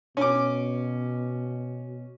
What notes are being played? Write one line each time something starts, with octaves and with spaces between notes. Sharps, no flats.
B2 C#4 D6